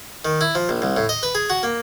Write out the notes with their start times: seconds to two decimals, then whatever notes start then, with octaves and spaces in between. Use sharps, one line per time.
0.25 D#3
0.41 E4
0.55 F3
0.69 A#1
0.82 C2
0.97 A2
1.09 D#5
1.23 B4
1.35 G#4
1.50 F#4
1.63 A#3